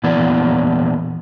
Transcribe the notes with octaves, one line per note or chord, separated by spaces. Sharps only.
A#2 E3 B3 A#4 D5